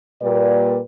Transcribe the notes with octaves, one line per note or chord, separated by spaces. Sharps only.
A#2 G3 A#3 B4 D5